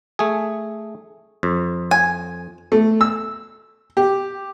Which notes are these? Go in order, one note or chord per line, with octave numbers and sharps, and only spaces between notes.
A3 G#4
F2
G#5
A3
E6
G4